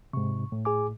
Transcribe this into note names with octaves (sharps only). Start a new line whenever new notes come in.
G#2 C3 C#6
A2
G#4 G#5 D6